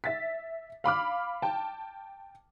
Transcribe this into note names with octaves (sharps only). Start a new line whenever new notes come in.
E5 A6 B6
F5 B5 D6 F6
G5 A5